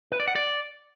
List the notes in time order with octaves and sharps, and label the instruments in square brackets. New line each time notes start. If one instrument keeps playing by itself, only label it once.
[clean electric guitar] B4
D5
F#5
D5